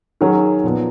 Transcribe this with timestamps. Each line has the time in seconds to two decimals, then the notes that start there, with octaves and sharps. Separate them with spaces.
0.21 D#3 F#3 C#4 G#4
0.64 A#2 F3 B3